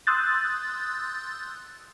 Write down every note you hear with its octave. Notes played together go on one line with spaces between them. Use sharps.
C6 D#6 E6 F#6 G6 A6